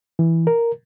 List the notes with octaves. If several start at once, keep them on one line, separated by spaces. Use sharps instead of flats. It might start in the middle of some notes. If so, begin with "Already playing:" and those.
E3
A#4